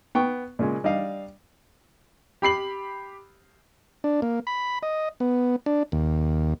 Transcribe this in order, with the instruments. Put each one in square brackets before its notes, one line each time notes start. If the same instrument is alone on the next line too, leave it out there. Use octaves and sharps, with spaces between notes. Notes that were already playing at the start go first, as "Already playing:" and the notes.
[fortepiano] B3 G5 C#6
A#2 C#3 G#3
G3 D4 D#5 F5
[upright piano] G4 B5 C7 F#7
[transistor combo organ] D4
A#3
B5
D#5
B3
D4
D#2